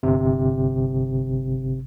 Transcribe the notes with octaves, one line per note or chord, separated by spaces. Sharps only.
G1 C3